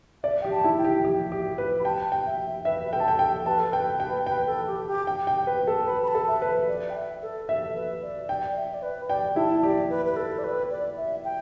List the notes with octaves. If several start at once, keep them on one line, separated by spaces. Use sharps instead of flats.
D5 E5
G4 G5
A5
E4
G5
G4
G4
G4
B4
B5
G5 A5
G5
E5
E5
B4 E5
B4
A4 G5
A5
G5
A4 G5
B4 A5
A4
B4 G5
G5
B4 G5
A4
G4
G4
G5
G5
B4
A4
B4 B5
B5
A5
A4
E5
B4
D5
G5
E5
A4
A4 E5
B4
D5
D5 G5
E5
D5
B4
D5 G5
E4 A5
G4 D5
B4
B4
A4
D5
B4
D5
E5
G5